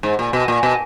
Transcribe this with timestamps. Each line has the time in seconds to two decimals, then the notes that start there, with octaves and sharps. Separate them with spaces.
0.03 G#2
0.19 A#2
0.33 B2
0.48 A#2
0.63 B2